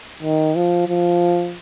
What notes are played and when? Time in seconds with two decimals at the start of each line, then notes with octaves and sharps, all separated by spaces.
0.23 D#3
0.56 F3
0.88 F3